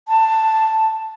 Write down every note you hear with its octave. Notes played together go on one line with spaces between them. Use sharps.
A5